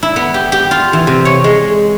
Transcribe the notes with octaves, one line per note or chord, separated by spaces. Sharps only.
E4
B3
G4
G4
F4
E3
C3
C#5
G#3